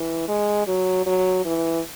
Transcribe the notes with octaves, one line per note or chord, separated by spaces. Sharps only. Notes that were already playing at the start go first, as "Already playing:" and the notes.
Already playing: E3
G#3
F#3
F#3
E3